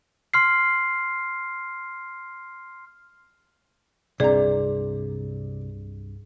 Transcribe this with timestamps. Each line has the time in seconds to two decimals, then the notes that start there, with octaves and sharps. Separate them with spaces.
0.34 C6 F6 C7
4.20 C2 G2 C3 G#4 D5 A#5